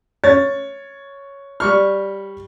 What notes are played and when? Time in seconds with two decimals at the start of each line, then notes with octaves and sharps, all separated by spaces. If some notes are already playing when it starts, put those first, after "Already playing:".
0.24 C#5 A6
1.60 G3 C#6 F6